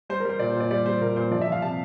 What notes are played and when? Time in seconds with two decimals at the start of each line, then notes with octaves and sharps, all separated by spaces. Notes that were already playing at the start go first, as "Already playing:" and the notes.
0.09 G3 C5
0.20 A#4
0.25 G3 C5
0.39 A#2 D5
0.50 C5
0.55 A#2 D5
0.71 G3 D5
0.86 G3 C5
1.01 A#2 A#4
1.16 A#2 C5
1.31 F3 D5
1.41 E5
1.47 F3
1.52 F5
1.62 C3 A5